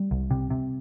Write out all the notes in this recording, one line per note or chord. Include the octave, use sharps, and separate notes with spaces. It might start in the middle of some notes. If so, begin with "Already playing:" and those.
Already playing: G3
C2
C3
C3